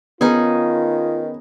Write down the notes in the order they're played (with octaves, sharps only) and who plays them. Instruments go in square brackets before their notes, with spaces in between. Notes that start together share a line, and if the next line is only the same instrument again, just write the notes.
[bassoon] D#3 [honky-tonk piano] B3 [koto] C#4 D#4 G#4 [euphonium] F4